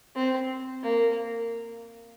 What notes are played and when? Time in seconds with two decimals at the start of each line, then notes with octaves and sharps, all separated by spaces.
0.16 C4
0.83 A#3